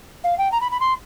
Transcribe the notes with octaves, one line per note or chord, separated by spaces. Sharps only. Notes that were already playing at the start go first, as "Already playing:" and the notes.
F5
G5
A#5
B5
B5
C6